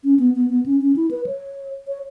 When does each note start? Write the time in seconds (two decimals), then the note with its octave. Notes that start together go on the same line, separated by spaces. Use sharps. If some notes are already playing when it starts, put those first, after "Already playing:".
0.04 C#4
0.19 B3
0.36 B3
0.50 B3
0.66 C#4
0.81 C#4
0.96 E4
1.11 B4
1.26 C#5
1.88 C#5